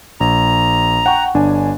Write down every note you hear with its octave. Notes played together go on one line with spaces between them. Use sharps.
A#1 A#5
F#5 G5 C#6
G1 D4 G#5